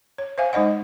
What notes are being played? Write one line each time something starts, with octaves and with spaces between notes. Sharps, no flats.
C#5
C5 E5 F5 G#5
G#3 D#4 C5 D#5 F#5